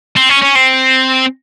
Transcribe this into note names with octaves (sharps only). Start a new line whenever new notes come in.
C4
C#4
C#4
C4